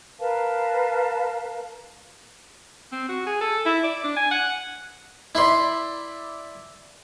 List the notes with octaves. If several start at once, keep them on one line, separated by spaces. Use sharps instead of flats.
A#4 B4 F5 A5
C4
F#4
G#4
A4
E4
D5
D4
G#5
F#5
E4 B4 D5 E5 C6